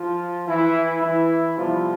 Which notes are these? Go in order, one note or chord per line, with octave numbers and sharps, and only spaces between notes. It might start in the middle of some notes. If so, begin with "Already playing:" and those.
Already playing: F3 F4
E3 E4
E3 E4
C3 F3 G3 B3 F4